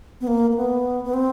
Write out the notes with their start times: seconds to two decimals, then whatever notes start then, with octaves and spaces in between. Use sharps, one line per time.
0.21 B3
0.27 A#3
0.51 A#3
0.56 B3
1.04 B3
1.13 C4